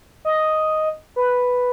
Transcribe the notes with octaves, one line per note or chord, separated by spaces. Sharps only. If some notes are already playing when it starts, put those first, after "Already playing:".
D#5
B4